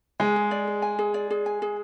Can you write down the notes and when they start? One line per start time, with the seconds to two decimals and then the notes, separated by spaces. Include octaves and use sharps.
0.20 G#3 G#5
0.36 G#4
0.51 D5
0.67 G#4
0.82 G#5
0.99 G#4
1.14 D5
1.30 G#4
1.46 G#5
1.62 G#4